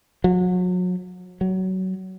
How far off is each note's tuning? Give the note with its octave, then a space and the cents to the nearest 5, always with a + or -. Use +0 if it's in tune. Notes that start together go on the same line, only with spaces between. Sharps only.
F#3 -35
F#3 +20